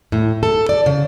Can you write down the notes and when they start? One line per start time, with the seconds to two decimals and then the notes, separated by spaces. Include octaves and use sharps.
0.12 A2
0.43 A4
0.69 D5
0.86 C#3